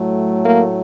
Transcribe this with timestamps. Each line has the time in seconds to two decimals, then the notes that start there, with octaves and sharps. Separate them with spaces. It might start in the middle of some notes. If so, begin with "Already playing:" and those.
Already playing: A2 F#3 A3
0.44 A#3